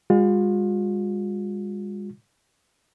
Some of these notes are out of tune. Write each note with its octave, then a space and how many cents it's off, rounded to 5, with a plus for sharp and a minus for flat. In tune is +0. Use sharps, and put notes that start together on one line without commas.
G#3 -40 F4 +40